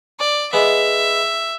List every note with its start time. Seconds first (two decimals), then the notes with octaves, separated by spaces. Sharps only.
0.20 D5
0.53 G#3 B3 E5